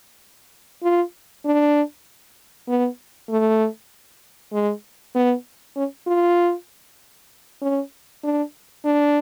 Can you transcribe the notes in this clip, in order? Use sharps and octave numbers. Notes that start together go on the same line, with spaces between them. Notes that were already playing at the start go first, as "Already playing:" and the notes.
F4
D4
B3
A3
G#3
B3
C#4
F4
C#4
D4
D4